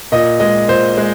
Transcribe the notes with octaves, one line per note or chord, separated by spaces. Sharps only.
A#2 D#5
G#3 D#5
A#2 C5
G#3